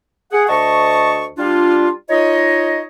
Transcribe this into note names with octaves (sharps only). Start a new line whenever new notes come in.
G#4 F#5
D2 D#5 A5 C#6
G3 D4 F4
D#4 F4 C#5 D#5